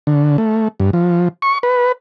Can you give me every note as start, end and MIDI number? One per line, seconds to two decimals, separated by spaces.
0.07 0.37 50
0.38 0.68 57
0.80 0.90 43
0.93 1.28 53
1.42 1.58 85
1.63 1.92 71